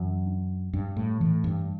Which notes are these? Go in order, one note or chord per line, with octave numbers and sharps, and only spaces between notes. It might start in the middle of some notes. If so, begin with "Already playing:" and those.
Already playing: F#2 E3
D4
G2 D4
A2
A2 E3
G2